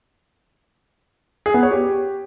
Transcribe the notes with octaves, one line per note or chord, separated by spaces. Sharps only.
G#4
B3
C#5
G4